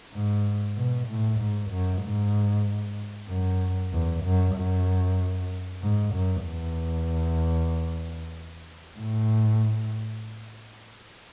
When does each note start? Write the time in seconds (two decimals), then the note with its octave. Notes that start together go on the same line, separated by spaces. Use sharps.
0.13 G#2
0.76 B2
1.08 A2
1.40 G#2
1.71 F#2
2.03 G#2
3.29 F#2
3.92 E2
4.24 F#2
4.55 F#2
5.82 G#2
6.14 F#2
6.45 E2
8.98 A2